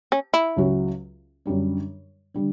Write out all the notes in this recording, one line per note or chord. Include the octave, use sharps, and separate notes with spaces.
C#4
E4
C#2 C#3 F#3 C#4 F#4
F#2 D3 G3 D4
D3 G3 D4